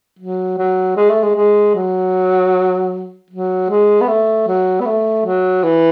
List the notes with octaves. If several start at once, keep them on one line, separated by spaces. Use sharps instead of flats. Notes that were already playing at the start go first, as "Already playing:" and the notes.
F#3
F#3
G#3
A3
G#3
G#3
F#3
F#3
G#3
B3
A3
F#3
B3
A3
F#3
E3